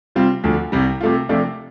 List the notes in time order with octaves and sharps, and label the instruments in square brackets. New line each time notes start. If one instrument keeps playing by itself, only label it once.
[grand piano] C3 G3 C4 F4
D2 D3 F3
C2 C3 G3
C3 A3 F4
C3 F3 A3 D4 F4